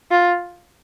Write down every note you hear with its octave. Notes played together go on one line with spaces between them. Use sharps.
F4